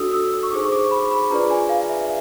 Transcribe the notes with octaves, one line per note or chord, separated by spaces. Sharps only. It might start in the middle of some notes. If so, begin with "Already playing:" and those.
Already playing: D4 F#4 A4 C#5 D#6 E6
E6
E6
C#6
D#4 G#4 C5 D6
C#6
D6
B5
B5
D4 F4 G#4 B4 D5 A#5
G#5
F5
E5